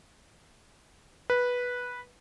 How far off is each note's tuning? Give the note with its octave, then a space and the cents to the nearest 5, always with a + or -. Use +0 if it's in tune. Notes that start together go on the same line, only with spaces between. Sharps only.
B4 -10